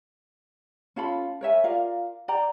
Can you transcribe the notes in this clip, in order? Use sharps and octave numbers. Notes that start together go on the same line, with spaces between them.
C#4 F4 A4 B5
A#4 C#5 E5 G#5
F4 A#4 D5 F5
D5 G5 A#5